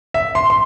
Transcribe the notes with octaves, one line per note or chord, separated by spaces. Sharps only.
E5
C6
C6